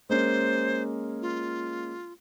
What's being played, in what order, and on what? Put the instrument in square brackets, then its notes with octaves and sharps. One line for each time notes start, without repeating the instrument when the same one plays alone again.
[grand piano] G#3 A#3 C#4 [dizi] C5
[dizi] F4